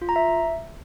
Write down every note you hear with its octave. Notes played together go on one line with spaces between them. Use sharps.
F4
A#5
E5